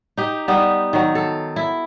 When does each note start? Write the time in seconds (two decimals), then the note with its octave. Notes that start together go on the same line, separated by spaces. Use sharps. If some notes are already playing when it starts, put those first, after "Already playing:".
0.17 D#4 G4
0.48 G3 B3 D#4
0.93 D#3 F#3
1.15 A4
1.56 E4